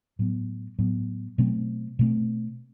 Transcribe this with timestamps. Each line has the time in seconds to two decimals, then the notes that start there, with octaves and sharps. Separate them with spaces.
0.19 A2 F#3 B3
0.79 A2 F#3 B3
1.38 B2 F#3 A3 C4
1.99 B2 A3 C4